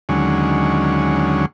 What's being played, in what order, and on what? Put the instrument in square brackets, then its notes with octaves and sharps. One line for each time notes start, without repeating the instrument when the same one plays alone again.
[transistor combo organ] D#2 D3 F#3 G#3 C#4